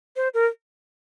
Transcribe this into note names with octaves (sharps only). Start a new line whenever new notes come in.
C5
A#4